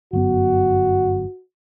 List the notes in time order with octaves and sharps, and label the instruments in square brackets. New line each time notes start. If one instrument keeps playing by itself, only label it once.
[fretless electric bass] G1 F#2 B3 [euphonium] F#4